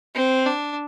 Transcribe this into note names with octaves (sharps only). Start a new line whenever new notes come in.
C4
D4